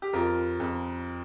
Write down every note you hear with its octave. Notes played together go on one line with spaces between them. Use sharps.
G4
F2 F4 A#4
F2